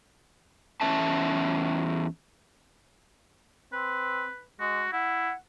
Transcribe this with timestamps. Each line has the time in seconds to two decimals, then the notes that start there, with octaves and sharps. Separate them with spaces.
0.81 E2 C#4 E5 A5
3.73 C4 B4
4.60 G#3 F#4
4.93 E4 F#5